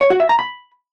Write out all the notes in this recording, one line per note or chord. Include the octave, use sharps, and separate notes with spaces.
C#5
F#4
E5
A#5
B5